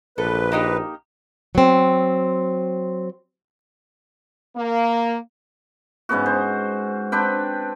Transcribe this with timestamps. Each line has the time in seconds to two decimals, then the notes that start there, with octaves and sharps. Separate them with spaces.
0.18 A#1 A4 B4
0.52 A#3 D#4 G4
1.55 F#3 C4
4.56 A#3
6.09 G#2 C#3 B3 F#4
6.26 C5
7.12 C4 D4 B4 G5